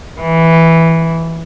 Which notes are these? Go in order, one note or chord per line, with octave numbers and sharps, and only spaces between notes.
E3